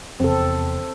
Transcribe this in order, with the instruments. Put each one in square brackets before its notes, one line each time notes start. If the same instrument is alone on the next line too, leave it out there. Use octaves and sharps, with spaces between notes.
[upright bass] F1 E2 [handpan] C4 A4